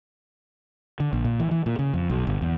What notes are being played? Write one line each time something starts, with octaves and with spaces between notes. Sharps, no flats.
D3
A#1
A#2
E3
E3
A#2
C#3
F2
B1
G1
E2